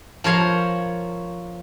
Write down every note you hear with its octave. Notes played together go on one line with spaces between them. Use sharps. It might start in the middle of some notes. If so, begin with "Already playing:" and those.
F3 A#4 C#5 F5